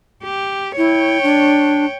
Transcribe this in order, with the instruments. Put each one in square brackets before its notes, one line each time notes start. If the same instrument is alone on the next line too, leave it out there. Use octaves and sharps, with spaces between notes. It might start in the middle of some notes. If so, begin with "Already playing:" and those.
[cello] G4
[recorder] E4 [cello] C#5 G5
[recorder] D4